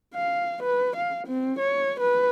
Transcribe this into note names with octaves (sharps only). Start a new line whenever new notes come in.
F5
B4
F5
C4
C#5
B4